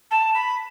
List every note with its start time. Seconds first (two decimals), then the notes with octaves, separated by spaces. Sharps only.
0.10 A5
0.34 B5